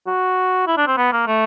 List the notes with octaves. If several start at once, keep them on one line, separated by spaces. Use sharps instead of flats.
F#4
E4
D4
C4
B3
A#3
A3